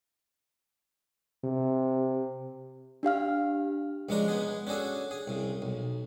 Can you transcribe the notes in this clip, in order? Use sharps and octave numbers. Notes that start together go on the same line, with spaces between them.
C3
D4 G4 F5 F6
C#2 F3 G#3 D4 A#5 C#6
G#3 B3 G#4
C#4 D4 F#4 G#4 A4
G#4
C2 C#3
B1